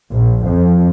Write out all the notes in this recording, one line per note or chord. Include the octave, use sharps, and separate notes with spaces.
A#1
F2